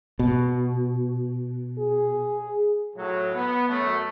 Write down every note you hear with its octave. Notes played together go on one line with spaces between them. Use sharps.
B2
G#4
A2 F#3
B3
F#2 F#3 A3